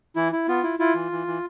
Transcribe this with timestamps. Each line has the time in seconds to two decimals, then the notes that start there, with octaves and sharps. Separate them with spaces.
0.16 E3 E4
0.32 E4
0.48 B3 F4
0.63 E4
0.79 E4 F4
0.95 E3
1.12 E3
1.27 E3